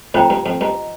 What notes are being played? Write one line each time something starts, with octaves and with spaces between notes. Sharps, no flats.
F2 A2 F4 C5 G5 A#5
G2
F2
G2 C5 D#5 A#5